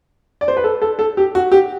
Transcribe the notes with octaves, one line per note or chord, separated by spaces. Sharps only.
D5
C5
B4
A4
A4
A4
G4
F#4
G4